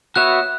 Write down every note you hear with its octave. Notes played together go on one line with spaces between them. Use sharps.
B3 F#4 C#5 E5 F#6